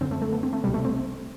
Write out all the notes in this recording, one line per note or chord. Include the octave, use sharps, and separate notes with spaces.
F#2 D3 C4
A3
A3
B3
C4
A3
C2 B2 G3
A3
C4